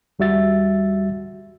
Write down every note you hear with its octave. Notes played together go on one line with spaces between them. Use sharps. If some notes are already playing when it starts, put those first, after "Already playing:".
D#2 G3 F#4 E5 A6